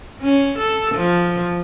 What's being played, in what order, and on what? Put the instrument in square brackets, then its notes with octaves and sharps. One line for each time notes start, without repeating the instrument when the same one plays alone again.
[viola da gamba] C#4
A4
F3